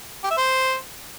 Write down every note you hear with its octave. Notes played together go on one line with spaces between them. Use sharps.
G4
E5
C5